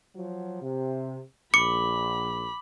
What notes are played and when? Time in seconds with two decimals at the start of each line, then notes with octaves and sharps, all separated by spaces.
0.16 F3 F#3
0.62 C3
1.54 A#1 B5 D6 C#7